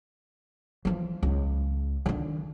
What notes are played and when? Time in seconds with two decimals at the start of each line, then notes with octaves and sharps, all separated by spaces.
0.85 E3 F3
1.23 C#2
2.06 D3 D#3